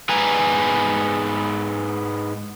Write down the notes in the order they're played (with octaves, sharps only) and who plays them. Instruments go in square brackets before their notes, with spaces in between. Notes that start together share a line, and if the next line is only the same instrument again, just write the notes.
[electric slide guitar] G#2 B3 B4 G#5 A#5